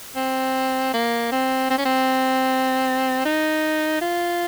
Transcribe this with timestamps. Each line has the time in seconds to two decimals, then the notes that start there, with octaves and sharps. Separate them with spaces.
0.16 C4
0.93 A#3
1.32 C4
1.70 C4
1.78 C#4
1.85 C4
3.25 D#4
4.01 F4